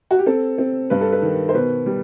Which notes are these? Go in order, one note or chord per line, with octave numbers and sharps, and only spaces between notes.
F#4
G4
C4 A4
C4
G2 B4
A4
B4
D#3
C5
B2 B4
G3